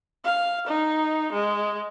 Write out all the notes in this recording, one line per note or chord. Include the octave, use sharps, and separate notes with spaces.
F5
D#4
G#3